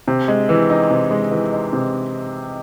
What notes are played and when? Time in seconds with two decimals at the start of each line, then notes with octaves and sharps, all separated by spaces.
0.08 C3
0.28 G#3
0.49 E3
0.70 D#4
0.90 C3
1.11 G#3
1.31 E3
1.52 D#4
1.73 C3